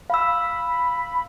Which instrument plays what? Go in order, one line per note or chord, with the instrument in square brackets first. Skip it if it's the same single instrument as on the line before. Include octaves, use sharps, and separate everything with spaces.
[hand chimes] F5 E6 [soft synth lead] B5